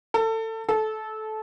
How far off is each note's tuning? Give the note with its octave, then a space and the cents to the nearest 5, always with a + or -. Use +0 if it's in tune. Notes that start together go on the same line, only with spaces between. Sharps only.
A4 +25
A4 -20